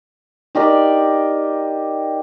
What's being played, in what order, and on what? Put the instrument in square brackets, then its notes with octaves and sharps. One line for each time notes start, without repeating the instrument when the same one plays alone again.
[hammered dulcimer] D#4 G4 A#4 D5